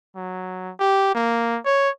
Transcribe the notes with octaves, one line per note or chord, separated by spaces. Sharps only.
F#3
G4
A#3
C#5